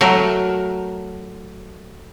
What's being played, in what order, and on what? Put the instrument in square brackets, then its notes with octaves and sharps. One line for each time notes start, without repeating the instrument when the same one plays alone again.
[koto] F#3 A3 A#4